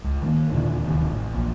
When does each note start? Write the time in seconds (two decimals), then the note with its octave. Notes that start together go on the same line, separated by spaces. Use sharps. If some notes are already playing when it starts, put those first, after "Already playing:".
0.04 C#2
0.22 D#3 G#3 A#3
0.52 D#2 A#2 D3 E3
0.83 D1 D#2 C3
1.12 A1
1.34 A#1